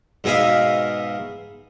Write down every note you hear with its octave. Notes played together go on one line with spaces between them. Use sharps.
G#2 B2 G#4 E5 F5